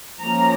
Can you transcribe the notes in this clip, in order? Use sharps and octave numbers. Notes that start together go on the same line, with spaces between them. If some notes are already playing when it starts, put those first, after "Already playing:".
F3 A#3 C#4 A#5